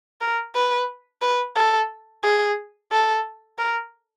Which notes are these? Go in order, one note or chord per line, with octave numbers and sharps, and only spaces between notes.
A#4
B4
B4
A4
G#4
A4
A#4